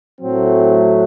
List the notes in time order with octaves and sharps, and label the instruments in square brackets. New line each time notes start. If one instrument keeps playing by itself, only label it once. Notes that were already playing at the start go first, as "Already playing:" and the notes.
[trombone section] A2 F#3 A3 C4